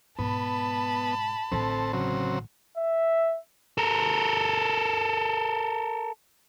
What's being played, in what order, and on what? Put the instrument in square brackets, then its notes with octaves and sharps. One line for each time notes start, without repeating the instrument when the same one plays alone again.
[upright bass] G#2 B2 [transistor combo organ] B3 [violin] A5 B5
[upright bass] A1 D3 [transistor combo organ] C4 A4
[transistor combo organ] C#3 F#3 C4
[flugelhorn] E5
[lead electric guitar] A4 A#4